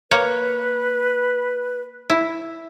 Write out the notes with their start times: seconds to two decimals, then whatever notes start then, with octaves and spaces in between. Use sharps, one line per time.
0.11 A#3 B4 C#5
2.10 E4